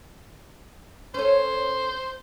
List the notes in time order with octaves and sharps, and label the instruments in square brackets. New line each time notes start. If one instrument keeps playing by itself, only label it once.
[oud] C#4 A4 [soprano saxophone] C5